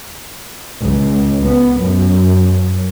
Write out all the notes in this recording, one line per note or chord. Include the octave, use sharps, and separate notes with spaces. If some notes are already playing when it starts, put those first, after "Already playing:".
C#2
B3
F#2